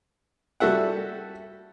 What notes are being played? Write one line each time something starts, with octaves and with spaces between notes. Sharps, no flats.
G3 F#4 A4 E5 F#5